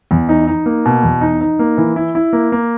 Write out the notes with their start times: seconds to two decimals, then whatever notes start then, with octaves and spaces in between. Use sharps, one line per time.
0.11 E2
0.29 D#4
0.47 D#4
0.66 A#3
0.85 B2
1.03 E2
1.21 D#4
1.41 D#4
1.59 A#3
1.77 E3
1.96 E4
2.15 E4
2.33 A#3
2.52 A#3